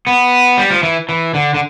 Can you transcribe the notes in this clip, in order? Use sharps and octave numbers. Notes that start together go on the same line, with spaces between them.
B3
G3
F3
E3
E3
D3
D3